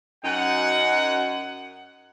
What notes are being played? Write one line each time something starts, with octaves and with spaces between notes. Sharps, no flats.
F#2 D#4 F#5